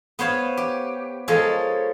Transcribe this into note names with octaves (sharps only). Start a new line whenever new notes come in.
B3 C5 C#5 F5
G4
F3 G#3 A4 A#4 C#5